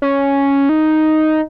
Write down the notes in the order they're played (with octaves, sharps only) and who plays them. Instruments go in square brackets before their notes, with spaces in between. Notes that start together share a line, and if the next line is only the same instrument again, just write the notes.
[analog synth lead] C#4
D#4